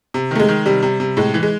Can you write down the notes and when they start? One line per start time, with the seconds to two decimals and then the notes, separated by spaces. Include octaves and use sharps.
0.14 C3
0.31 D#3 A3
0.40 G#3
0.49 D#3
0.66 C3 G3
0.83 C3
1.00 C3
1.17 A2 G#3
1.34 E3
1.43 G#3